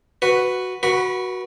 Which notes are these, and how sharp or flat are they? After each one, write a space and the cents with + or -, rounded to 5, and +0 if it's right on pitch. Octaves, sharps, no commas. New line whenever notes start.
F#4 +0 B4 +0
F#4 +0 B4 -40 B5 +0